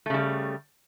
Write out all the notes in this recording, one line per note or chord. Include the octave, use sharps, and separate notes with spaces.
C#3 G3 A3